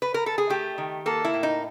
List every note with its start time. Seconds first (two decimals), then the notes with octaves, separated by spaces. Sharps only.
0.02 B4
0.14 A#4
0.26 A4
0.38 G#4
0.50 A3 G4
0.78 D#3
1.06 A#3 A4
1.25 E4
1.34 A2
1.43 D#4